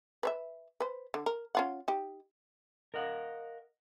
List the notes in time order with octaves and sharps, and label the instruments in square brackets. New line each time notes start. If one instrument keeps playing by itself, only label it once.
[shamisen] B4 C#5 E5
B4 C5
D3
A#4
C#4 F4 F#5
D#4 G4
[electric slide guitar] A#4 D#5 F5 F#5